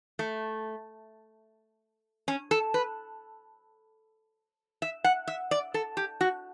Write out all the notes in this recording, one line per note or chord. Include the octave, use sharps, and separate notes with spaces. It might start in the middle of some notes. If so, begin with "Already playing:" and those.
A3
C#4
A4
B4
E5
F#5
E5
D5
A4
G4
F#4